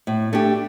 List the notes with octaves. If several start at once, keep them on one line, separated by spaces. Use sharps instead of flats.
A2
A3 D4 G4